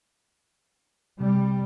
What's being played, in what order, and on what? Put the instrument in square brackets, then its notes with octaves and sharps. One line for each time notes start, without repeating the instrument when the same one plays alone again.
[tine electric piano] C3 [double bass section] G3